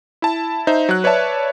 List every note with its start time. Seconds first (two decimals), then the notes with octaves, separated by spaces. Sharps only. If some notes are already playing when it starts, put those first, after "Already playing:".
0.22 E4 A5
0.67 D#4 C5 E5
0.89 F#3 F#6
1.04 B4 C#5 D5 E5 A5